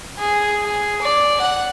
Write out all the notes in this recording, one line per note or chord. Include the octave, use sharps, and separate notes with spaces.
G#4
G#4
D5
F#5